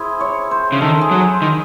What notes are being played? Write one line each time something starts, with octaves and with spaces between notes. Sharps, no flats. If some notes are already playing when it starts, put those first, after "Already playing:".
Already playing: E4 G#4 C5
C#5
C5
C#3
D#3 A4
G#4
F#3
C5
D#3